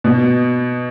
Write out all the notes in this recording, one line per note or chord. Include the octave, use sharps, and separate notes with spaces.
B2